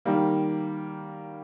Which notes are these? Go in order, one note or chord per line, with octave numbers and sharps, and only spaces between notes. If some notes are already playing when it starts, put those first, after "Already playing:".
D#3 G3 A#3